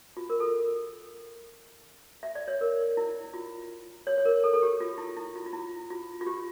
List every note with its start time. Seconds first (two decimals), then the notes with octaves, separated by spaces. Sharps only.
0.17 F4
0.30 A#4
0.40 A4
2.23 E5
2.35 D5
2.48 C#5
2.61 A#4
2.97 E4
3.34 F4
4.07 C#5
4.18 C#5
4.25 A#4
4.44 A4
4.54 A4
4.62 G4
4.80 F4
4.98 E4
5.17 E4
5.35 F4
5.46 F4
5.53 E4
5.90 F4
6.21 F4
6.26 G4